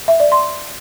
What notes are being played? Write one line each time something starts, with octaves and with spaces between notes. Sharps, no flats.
E5
D5
C6